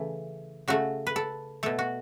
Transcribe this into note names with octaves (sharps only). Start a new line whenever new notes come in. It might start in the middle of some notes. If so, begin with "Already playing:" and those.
Already playing: C#3 E3 A3 A4
C#3 A3 F#4
B4
A4
B2 A3 A4
F#4